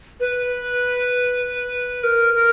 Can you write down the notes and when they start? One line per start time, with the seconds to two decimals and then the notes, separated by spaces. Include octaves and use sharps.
0.20 B4
2.03 A#4
2.34 A#4